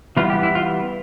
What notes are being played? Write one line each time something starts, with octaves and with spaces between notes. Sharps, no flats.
E3 G3 B3 F4
G4
E4
F4